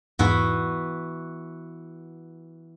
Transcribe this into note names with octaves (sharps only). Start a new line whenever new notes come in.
E2 G#2 E3 B3 F#4